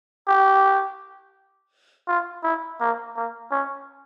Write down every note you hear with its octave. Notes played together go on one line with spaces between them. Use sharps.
G4
F4
E4
A#3
A#3
C#4